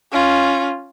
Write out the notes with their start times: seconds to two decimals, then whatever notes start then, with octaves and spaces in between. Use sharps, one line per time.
0.12 C#4 F4